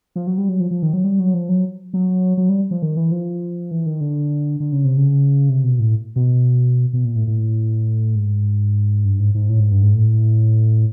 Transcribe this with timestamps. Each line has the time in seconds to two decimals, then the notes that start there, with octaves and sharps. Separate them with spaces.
0.16 F3
0.27 F#3
0.38 G3
0.49 F#3
0.60 F3
0.71 F3
0.82 D#3
0.93 F#3
1.04 G3
1.19 F#3
1.34 F3
1.49 F#3
1.94 F#3
2.37 F#3
2.49 G3
2.71 F3
2.82 D#3
2.97 E3
3.12 F3
3.71 E3
3.86 D#3
4.01 D3
4.60 D3
4.72 C#3
4.85 C3
4.97 C#3
5.49 C3
5.64 B2
5.79 A2
6.16 B2
6.93 B2
7.05 A#2
7.15 A2
7.27 A2
8.15 G#2
9.05 G2
9.20 G#2
9.34 G#2
9.49 A2
9.60 G#2
9.71 G2
9.83 G#2
9.93 A2